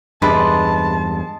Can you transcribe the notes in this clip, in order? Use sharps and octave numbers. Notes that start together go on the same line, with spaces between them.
E2 G2 C3 G#3 D4 B4 A5